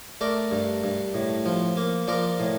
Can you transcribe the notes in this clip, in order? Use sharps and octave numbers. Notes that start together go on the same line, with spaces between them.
A3 A#4 D5
G2
G2
A2
F3
A#3
F3 A#4 D5
A2